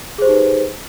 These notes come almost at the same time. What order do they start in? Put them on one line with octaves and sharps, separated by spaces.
G#4 C5 G4 D#4 B4